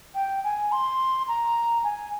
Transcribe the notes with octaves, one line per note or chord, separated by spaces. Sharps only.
G5
G#5
C6
A#5
G#5